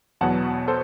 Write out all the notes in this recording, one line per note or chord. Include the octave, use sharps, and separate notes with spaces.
E2 B2 F#3 B3 F#5 A5
A4 C5